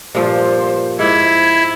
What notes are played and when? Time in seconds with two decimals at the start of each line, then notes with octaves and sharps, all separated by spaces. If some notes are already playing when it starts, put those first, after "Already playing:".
0.15 G2 A#2 F3 C5
0.99 G#2 E4 G#6